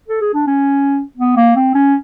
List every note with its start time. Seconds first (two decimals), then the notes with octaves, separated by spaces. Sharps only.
0.08 A4
0.21 G#4
0.34 D4
0.47 C#4
1.17 B3
1.37 A#3
1.56 C4
1.75 C#4